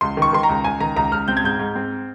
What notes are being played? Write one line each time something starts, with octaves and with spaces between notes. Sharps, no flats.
C#2 C6
D#3 C#6
D#3 C6
A#5
C#2
C#2 G#5
D#3 A#5
C#2 A#5
C#2 F6
C4 G6
G#6
G#2 G6
G#2
C4